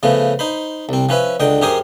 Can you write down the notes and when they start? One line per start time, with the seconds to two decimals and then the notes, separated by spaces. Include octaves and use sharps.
0.03 C#3 F3 A3 B3
0.39 D#4 C5 B5
0.89 C2 C4
1.09 F3 C#4 B4 E5
1.40 C#2 D3 D#5 G5
1.61 F#2 G4 G#4 A#4 C5 D#6